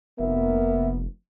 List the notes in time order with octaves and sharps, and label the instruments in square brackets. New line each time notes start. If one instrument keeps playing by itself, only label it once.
[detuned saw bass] F1 [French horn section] A#3 B3 A#4 [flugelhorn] E5